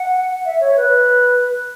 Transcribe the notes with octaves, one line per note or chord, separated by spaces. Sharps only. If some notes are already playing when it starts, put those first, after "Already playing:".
Already playing: F#5
E5
C#5
B4